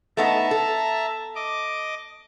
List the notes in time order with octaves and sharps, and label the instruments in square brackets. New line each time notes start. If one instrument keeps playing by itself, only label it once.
[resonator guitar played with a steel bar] A3 B3 D#4 [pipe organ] E5 A5 A#5
[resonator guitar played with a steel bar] A4
[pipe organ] D#5 D6